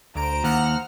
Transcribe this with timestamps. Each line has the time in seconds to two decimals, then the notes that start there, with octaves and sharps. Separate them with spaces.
0.15 D2 C5 A#5 D7
0.44 D#2 F#5 F6